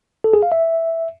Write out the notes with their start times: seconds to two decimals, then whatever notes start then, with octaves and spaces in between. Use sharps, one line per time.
0.24 A4
0.33 G#4
0.43 F5
0.52 E5